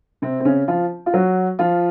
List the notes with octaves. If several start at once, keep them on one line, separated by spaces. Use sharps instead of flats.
C3 C4
C4
C#3 C#4
F3 F4
F4
F#3 F#4
F3 F4